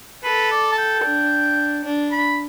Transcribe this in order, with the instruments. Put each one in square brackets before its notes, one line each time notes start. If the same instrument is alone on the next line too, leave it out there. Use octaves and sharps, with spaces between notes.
[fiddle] A4 [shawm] B4
[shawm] D5
A5
G5
[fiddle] D4
D4
[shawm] B5